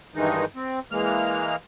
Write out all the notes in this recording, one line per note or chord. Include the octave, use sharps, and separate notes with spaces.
G2 D#3 E3 G#3 D#4
C4
E3 G#3 A#3 F6